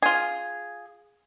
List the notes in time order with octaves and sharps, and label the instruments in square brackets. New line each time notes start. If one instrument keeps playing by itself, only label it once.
[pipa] F4 G#4